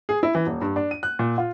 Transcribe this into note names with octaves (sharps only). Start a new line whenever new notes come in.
G#4
E4
E3
D#1
G2
D4
D#7
F#6
A#2
F4